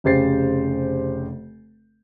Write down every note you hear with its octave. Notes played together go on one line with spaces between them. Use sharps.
F1 C#3 G4 C5 A6 C7